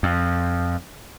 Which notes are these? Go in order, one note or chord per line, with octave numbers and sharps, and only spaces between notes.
F2